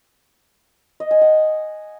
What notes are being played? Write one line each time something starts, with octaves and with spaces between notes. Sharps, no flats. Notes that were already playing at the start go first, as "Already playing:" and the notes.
D#5
G#5
F#5